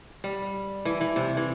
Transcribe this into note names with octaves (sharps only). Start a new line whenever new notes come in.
G3
E3
E3
C3
E3